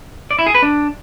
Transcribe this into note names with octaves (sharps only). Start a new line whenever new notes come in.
D5
E4
G#4
B4
D4